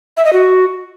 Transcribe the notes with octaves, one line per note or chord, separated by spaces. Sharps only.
E5
D#5
F#4